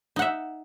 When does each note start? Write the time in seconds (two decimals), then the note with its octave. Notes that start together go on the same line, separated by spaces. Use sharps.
0.16 D#4
0.19 F#5
0.22 E5